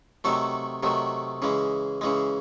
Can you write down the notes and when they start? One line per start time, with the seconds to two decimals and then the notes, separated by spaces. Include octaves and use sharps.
0.24 C3 D#3 F#3 A3 A4
0.83 C3 D#3 F#3 A3
1.42 C#3 E3 G#3
2.01 C#3 E3 G#3